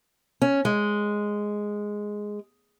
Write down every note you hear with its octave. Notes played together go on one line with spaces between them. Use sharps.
C#4
G#3